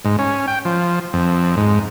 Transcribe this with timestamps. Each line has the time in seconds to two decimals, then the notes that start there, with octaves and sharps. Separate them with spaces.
0.05 G#2
0.19 C#4
0.48 G5
0.65 F3
1.14 F2
1.57 G#2